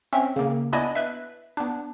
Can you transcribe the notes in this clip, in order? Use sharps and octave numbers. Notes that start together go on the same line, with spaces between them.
C4 C#4 E5
C#3 A#3
B3 D4 E4 D5 D#5 G#5
B4 E5
B3 D4